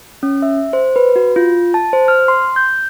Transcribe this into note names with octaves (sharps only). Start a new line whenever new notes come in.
C#4
E5
C5
B4
F#4
F4
A5
C5
F6
C6
G6